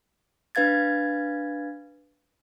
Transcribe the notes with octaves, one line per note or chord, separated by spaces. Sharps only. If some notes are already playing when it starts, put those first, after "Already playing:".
D4 B4 F5 G#6 A6